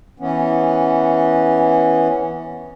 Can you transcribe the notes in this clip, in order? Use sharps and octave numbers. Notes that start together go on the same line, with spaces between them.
E3 B3 C#4